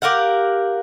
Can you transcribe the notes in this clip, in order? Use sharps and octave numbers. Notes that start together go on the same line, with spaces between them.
G4 A#4 F5 F#5